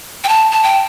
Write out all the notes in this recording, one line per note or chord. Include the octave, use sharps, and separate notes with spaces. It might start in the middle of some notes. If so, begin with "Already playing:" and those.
G5
A5
A5
G5